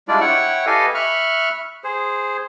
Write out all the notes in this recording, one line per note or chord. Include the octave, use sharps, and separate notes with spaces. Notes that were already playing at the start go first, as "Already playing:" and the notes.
G3 G#3 D4 E4 F4 D5
E4 C#5 F#5 G5 C#6
G4 A4 B4 D#5 F5 G#5
E5 B5 C#6 F6 F#6
G#4 C5